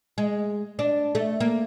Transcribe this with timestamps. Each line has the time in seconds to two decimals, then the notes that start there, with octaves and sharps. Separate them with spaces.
0.18 G#3
0.79 D4
1.15 A3
1.40 A#3